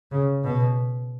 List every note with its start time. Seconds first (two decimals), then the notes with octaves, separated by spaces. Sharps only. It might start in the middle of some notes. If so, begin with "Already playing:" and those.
0.11 C#3
0.43 B2